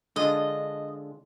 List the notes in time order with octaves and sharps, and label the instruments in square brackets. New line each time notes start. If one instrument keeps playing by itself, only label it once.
[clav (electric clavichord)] D3 G#3 D4 F4 [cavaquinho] D#5